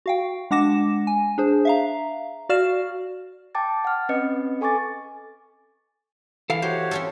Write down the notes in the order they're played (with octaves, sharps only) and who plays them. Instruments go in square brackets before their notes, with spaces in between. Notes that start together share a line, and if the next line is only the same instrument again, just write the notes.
[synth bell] F#4 F5 G5
G#3 D4 F#5 D6 A#6 E7
G#5
D4 G#4 C5
E5 F5 A#5
F#4 D5 F5 F6 E7
[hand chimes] G5 A5 D6 A6
F#5 F6
C4 C#4 B4 D#5 C#7
A4 G#5 C#6 D6 A6
[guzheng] E3 [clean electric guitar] A4 F5
[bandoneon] F#4 G4 C#5 [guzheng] C5
[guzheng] C4 C#4 A4